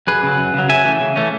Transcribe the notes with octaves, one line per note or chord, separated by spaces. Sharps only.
F#2 G#4 B4
C#3 F#3
F#2
C#3 F#3
C#3 E5 G#5
E3 A3 C#4
C#3
E3 A3 C#4